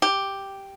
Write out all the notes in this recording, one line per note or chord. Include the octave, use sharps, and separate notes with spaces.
G4